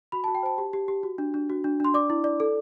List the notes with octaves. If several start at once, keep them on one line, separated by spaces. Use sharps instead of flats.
F#4 B5
F#4 A5
G5
C5 A5
G4
G4
G4
F#4
D4
D4
F#4
D4
D4 C6
D5 D6
E4
D5
A4